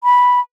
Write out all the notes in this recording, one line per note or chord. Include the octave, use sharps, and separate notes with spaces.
B5